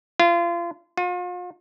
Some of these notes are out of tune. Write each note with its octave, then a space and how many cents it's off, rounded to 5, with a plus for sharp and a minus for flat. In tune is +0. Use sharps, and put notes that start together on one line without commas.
F4 -30
F4 +40